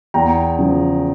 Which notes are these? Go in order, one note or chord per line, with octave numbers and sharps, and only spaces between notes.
E2 G5 A#5
C#3 F3